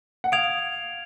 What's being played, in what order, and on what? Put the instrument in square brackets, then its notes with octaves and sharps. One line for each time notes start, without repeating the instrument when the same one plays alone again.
[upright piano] F#5
[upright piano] F5 [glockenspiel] D#6 G#6 D7 F7